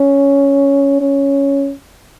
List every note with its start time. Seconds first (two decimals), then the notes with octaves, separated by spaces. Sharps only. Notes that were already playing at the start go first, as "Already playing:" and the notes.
Already playing: C#4
1.01 C#4